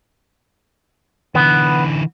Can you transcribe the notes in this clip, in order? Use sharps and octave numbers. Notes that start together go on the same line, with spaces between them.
D3 E3 B3